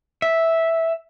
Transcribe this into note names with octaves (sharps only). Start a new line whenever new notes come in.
E5